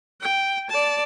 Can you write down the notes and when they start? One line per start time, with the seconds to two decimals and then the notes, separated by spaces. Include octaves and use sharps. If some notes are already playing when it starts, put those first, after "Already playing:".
0.21 G5
0.69 D5 A5